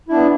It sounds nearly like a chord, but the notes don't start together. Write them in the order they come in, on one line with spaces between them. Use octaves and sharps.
E4 D4 B3